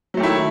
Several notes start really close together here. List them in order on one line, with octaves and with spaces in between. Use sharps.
F#3 A3 D#3 E4